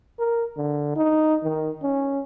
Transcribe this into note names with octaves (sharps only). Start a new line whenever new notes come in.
A#4
D3
D#4
D#3
C#4